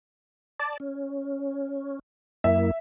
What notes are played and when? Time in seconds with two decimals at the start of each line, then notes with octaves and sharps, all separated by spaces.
0.60 D5 A5
0.80 C#4
2.44 F#2 A#3 E4 E5